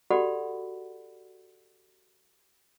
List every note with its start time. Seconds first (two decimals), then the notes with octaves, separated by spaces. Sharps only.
0.10 F#4 G4 A4 D5 F#5 B5